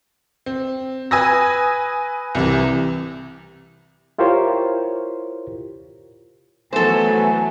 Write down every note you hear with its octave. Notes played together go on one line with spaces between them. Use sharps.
C4
B4 G#5 D#6 E6 A#6
C2 C3 E3
E4 F4 G4 A#4 C5 C#5
E3 F#3 A3 B3 A4 C5 G#5